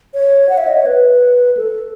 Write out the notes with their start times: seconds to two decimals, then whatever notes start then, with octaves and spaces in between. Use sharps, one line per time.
0.14 C#5
0.49 F#5
0.58 E5
0.67 D#5
0.77 C#5
0.86 B4
1.57 A4